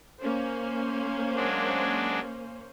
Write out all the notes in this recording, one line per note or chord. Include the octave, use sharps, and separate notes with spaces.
A#3 C#4 C5
F#3 G#3 D4